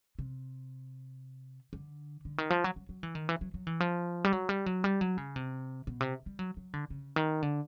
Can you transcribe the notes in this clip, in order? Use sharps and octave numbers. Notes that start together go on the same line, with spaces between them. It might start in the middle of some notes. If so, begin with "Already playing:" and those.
C3
D3
D3
D#3
F3
F#3
F#3
F#3
E3
D#3
E3
F#3
F#3
E3
F3
G3
F#3
G3
F#3
G3
F#3
C#3
C3
B2
C3
G3
F#3
F#3
D3
C#3
D#3
D3